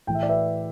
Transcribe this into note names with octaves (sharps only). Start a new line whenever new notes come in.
A2 E3 G5
E5
D5
B4 E5